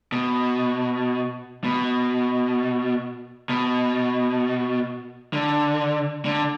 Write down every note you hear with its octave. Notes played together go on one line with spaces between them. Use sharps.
B2
B2
B2
D3
D3